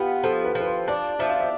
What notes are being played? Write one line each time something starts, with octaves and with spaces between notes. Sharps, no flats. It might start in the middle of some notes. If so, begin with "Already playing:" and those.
Already playing: B3 F4 G4
F3 A4
B4
F3
B4
C5
D4 D5
F3 E5
F5
E5